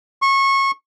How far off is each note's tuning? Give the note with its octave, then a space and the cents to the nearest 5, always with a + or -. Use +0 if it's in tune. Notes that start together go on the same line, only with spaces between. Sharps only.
C#6 -25